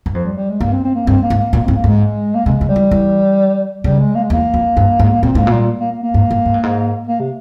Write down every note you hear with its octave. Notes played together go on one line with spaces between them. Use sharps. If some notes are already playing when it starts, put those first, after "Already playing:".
G2
F2 F3
G3
G3
G#3
G2 A#3
C4
C4
A#3
G2 C4
A#3
G#2
A#3
A#2 A#3
G#2 C4
A#3
G#2 G#3
A#3
C3 G#3
C#3
G3
E3
E3
C#3 G3
G#3
A#3
G#3
E2
A#3
F2
G2
G#2
A#3
A#2 C4
G#2 A#3
A#2
G3
A#3
A#3
A#3
G#2
G2
G#2
G2
G#2
A#3
C3